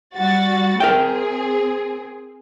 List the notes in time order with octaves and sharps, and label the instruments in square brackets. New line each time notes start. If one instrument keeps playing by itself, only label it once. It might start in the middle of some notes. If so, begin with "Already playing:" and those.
[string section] G3 F#4 A6
[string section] C4 G#4 [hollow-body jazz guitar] A#4 E5 G5